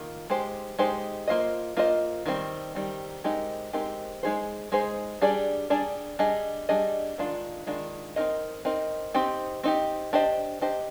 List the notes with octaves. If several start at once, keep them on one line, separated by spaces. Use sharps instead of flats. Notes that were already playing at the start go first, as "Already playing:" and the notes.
Already playing: D#3 A#3 F4
G#3 D#4 G4 C5
G#3 D#4 G4 C5
A#3 F4 C5 D#5
A#3 F4 C5 D#5
D#3 G3 C4
D#3 G3 C4
G#3 C4 D#4 G4 A#4
G#3 C4 D#4 G4 A#4
G#3 D#4 G#4 C5
G#3 D#4 G#4 C5
G3 D4 G#4 D5
G3 D4 G#4 D5
G3 D4 G#4 D#5
G3 D4 G#4 D#5
D#3 G#3 D4 F4
D#3 G#3 D4 F4
C4 D#4 A#4 D#5
C4 D#4 A#4 D#5
C4 D#4 G4
C4 D#4 G4
D4 G4 C5 D#5
D4 G4 C5 D#5